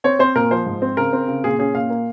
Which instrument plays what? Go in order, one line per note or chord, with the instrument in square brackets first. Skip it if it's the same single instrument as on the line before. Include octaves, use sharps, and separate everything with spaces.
[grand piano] C4 C#5
C4 C5
A#2 A#4
F3 C5
G#2
C4
C#3 A#4
C4
C#3
A#2 G#4
C#4 G#4
A#2 F5
A#3